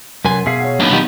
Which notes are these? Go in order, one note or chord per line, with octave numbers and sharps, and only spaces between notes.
C2 F#2 B4 G#5 C6
B2 G#4 E5 F5
C#5 F#5
B1 A#3 B3 D4
D#3 G3 D#4 G4